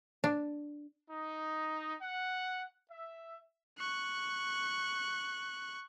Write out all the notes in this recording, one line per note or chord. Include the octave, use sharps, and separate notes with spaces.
D4
D#4
F#5
E5
C#6 F#6